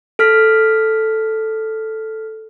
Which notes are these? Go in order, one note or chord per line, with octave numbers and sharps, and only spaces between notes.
A4 F6 B6